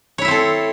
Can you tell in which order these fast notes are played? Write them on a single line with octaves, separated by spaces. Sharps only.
C#5 E4 E5 C4 A4